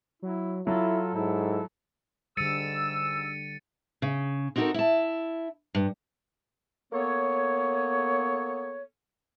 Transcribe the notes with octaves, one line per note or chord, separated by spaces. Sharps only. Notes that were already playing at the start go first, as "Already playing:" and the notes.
F#3 E4
F#3 E4 F4 A4
G#2 E4
G#2 D3 G3 E6 A6 C#7 D#7
C#3
C4 D#4 F#4 G4 A4 A#4
E4 A5
G2
A#3 B3 A4 C#5